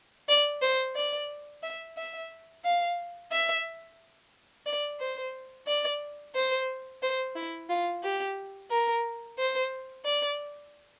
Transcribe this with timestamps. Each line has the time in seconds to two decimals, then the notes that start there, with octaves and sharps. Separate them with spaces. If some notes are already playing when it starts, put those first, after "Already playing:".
0.29 D5
0.62 C5
0.95 D5
1.63 E5
1.97 E5
2.64 F5
3.32 E5
4.66 D5
5.00 C5
5.67 D5
6.35 C5
7.02 C5
7.36 E4
7.69 F4
8.03 G4
8.71 A#4
9.38 C5
10.05 D5